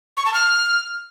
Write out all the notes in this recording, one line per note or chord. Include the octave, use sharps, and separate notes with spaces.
C#6
A5
F6